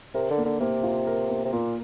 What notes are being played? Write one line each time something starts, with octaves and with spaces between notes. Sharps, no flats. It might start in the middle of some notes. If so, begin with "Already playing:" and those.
C3 A#4
D3
A#3
D3
C3 A#3
F4
A#4
A#3
C3
A#2 A#3